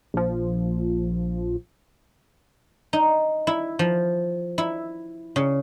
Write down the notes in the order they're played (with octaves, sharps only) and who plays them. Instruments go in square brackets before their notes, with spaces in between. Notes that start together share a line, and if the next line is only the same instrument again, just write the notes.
[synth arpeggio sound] A#1 F3
[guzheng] D#4
E4
F3
E4
C#3